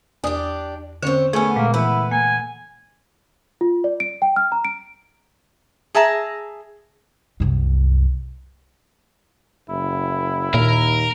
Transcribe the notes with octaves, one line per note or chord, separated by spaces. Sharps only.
E2 D4 G4 D#6
D3 C4 C#4 C#5
A3 B3 C#4 G#4 G#5
A#2 G#3 A#3
E3 B3 E4 B4
A#3 G#5
F4
D5
D7
G5
F6
A#5
D7
G#4 E5 A5 A#5
C2 F#2
F#1 E4
D#2 A#2 A#4